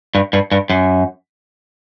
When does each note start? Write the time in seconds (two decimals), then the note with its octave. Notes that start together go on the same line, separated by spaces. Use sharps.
0.15 G2
0.33 G2
0.52 G2
0.70 F#2